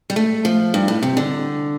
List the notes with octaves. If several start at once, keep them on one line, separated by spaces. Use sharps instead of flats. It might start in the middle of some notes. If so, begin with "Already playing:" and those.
G3
A3
F3
G2
A2
C3
D3